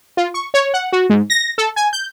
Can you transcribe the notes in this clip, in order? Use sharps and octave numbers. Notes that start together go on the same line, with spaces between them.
F4
C#6
C#5
F#5
F#4
G#2
A#6
A4
G#5
G6